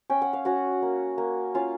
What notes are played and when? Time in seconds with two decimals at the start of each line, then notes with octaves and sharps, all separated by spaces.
0.10 C#4 G5
0.22 F#5
0.33 F5
0.45 C#4 F#4 F#5
0.82 A#3
1.18 A#3
1.54 C#4 F4 F5